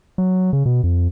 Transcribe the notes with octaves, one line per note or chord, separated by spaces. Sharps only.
F#3
C#3
B2
F2